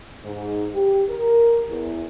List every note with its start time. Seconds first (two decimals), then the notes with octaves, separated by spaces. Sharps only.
0.22 G#2
0.73 G4
1.09 A#4
1.68 E2